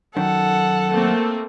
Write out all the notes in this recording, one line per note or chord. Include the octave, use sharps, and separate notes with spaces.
F#2 D#3 A4 F#5
A3 A#3 C4